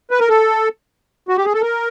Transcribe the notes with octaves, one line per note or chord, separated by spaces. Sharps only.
B4
A#4
A4
F#4
G4
G#4
A4
A#4